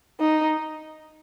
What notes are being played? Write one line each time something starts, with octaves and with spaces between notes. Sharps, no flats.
D#4